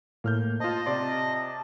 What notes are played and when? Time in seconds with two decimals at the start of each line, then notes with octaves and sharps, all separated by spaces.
0.24 A2 A#3 F6 G6
0.60 F4 C5 D#5 A5
0.86 C3 D5 C6